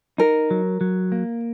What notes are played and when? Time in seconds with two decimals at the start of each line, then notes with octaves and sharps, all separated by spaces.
0.18 D#4 A#4
0.51 F#3
0.81 F#3
1.12 A#3